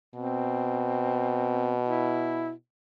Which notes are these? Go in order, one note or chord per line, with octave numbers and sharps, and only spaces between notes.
B2 C4
E4